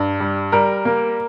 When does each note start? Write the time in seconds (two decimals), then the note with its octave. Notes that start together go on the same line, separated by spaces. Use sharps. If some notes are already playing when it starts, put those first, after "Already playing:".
Already playing: G2
0.20 G3
0.52 G3 A#4
0.85 A#3